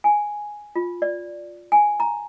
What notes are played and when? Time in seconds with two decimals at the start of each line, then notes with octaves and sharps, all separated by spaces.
0.04 G#5
0.76 F4
1.02 D5
1.72 G#5
2.00 A#5